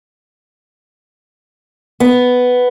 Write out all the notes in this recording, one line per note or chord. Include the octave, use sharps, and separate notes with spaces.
B3